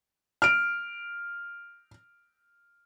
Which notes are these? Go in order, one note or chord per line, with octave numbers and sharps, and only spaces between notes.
F6 D7